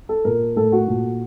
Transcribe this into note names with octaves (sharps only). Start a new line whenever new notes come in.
A4
A#2 A#4
A2 A4
F#4
A#2